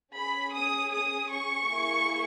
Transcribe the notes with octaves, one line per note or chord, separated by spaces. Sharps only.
C#4 G#4 B5
D#6
D#6
C#6
A#3 E4 G#4